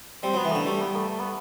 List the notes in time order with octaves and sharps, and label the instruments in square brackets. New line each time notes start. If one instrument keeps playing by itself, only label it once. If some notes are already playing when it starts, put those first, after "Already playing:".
[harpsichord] G3 [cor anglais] C4
[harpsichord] F#3
[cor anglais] B3
[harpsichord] E3
[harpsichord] D3 [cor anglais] A3
[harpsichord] G3 [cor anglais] A3
[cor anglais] B3
A3
A3
B3